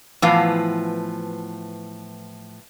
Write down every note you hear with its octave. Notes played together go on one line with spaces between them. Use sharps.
A2 E3 F3 B3 F5